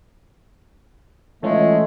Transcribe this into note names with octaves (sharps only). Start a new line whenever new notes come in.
E3 G#3 A3 C#4 F4